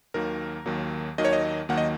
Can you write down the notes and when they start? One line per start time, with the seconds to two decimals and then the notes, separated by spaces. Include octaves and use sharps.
0.14 D#2 D#3 F#3 A#3 A#4
0.66 D#2 D#3 F#3 A#3
1.18 D#2 D#3 F#3 A#3 D#5
1.25 C#5
1.33 D#5
1.69 D#2 D#3 F#3 A#3 F#5
1.78 D#5